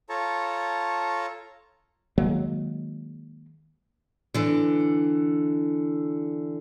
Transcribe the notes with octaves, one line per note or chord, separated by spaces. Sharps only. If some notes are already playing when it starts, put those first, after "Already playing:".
F4 A4 C#5 A5 A#5 C#6
D#3 F#3 G#3 A#3
D3 E3